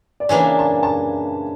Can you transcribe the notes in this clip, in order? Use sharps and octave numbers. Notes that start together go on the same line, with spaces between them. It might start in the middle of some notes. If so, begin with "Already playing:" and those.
D5
C#3 E3 A#3 D4 C#5
A5
A5